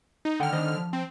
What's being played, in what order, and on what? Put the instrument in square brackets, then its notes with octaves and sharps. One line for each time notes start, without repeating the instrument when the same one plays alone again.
[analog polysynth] D#4
[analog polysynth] D3 F6 [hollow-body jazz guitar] D#3 F#5 G5
[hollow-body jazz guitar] D#3 C5 D#5
F3
[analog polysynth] C4